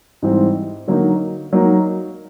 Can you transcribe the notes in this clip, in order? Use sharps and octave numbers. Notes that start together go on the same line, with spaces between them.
G#2 E3 G3 C4
D3 F#3 A#3 D#4
F#3 A#3 D#4